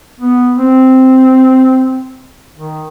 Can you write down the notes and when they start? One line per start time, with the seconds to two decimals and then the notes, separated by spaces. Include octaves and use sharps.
0.20 B3
0.57 C4
2.56 D#3